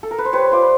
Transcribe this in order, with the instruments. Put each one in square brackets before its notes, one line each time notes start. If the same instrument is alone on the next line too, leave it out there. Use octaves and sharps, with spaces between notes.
[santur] A4
A#4
B4
C5
G3 B4 C#5
F4 C5 D5